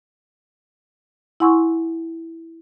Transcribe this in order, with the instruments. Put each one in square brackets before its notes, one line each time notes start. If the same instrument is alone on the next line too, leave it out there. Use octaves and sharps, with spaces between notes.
[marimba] E4 F#5 G#5 C6 C#6 E6